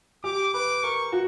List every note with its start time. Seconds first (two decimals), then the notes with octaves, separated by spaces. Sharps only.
0.24 G4 D6
0.54 B4 D6
0.83 A#4 C#6
1.12 F#4